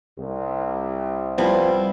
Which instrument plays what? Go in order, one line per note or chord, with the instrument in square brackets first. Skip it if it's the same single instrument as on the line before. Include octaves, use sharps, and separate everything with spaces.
[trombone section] C2
[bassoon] F3 [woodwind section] G3 [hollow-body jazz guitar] B3 C4 E4